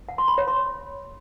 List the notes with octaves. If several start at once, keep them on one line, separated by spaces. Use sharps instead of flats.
F#5
C6
B5
C#5
C6